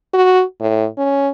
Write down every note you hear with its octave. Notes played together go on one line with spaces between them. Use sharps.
F#4
A2
C#4